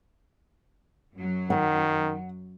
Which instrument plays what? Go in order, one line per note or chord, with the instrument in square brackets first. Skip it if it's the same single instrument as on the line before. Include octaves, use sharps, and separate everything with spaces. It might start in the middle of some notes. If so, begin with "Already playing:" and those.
[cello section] F#2 F#3
[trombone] D#3 [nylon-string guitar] F#5